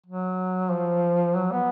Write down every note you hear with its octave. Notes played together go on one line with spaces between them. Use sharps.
F#3
F3
F#3
B3